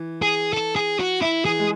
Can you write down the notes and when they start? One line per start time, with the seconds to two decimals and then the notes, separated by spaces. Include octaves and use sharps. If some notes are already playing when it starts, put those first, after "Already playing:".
Already playing: E3
0.22 G#4
0.53 A4
0.76 G#4
1.00 F#4
1.22 E4
1.45 E3 G#4
1.59 G#3